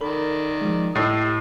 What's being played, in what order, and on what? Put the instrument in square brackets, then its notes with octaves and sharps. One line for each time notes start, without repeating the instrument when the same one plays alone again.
[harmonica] D#3 D5 [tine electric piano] A4 A#4 B5
[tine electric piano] F3 G#3
[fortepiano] A2 [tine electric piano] G4 D#5 C7 [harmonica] E6